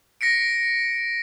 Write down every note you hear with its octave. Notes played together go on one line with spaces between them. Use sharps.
A#6 B6 C#7 D7